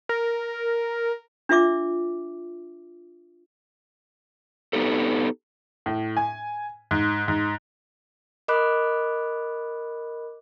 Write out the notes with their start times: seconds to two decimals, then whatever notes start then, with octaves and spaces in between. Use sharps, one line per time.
0.09 A#4
1.49 D4 F4 E5 D6
4.73 B3 D#4 G4 A4
5.86 A2
6.17 G#5
6.91 G#2
7.28 G#2
8.48 A#4 D#5 B5 D6 F#6